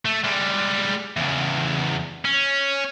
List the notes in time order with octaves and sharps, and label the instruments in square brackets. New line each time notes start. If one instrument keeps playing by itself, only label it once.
[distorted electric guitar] A3
G3 G#3
E2 C#3
C#4